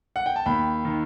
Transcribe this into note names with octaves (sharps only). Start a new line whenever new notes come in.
F#5
G5
A5
D#2 G5 B5
D#3